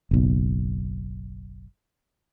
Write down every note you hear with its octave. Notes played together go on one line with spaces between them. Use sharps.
F#1 B1